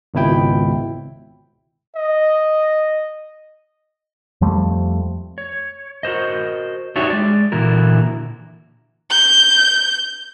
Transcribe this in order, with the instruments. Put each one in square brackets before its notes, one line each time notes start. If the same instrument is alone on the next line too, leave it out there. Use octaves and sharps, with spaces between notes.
[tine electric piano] G#1 C#2 B2 E4 G5
[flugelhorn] D#5
[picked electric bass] F2 F3 G3 A3
[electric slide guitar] C#5
F#4 A#4 C5 D#5
D4 D#4 F#4 G4 C#5 E5
G#3 D5
A#2 D3 E3 E4 F#4 A#4
[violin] G6